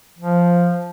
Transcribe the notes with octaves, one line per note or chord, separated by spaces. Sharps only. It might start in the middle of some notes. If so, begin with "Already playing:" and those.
F3